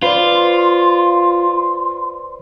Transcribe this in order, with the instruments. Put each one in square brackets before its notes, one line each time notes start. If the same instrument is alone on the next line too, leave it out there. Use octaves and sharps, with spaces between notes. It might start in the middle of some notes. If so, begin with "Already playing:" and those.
[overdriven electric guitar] F4 [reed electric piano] B4 C5 D5 [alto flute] C6